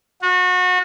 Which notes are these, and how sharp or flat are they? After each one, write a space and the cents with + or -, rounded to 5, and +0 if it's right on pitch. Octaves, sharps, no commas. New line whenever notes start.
F#4 -30